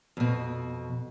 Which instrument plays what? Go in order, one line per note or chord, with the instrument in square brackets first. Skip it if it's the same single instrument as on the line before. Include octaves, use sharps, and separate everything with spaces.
[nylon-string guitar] F2 B2